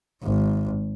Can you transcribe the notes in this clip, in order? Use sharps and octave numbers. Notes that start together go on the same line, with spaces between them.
G#1